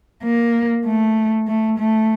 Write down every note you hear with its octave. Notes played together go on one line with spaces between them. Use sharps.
A#3
A3
A3
A3